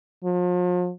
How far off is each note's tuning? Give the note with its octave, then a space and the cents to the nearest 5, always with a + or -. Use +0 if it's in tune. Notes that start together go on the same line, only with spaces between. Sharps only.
F3 +40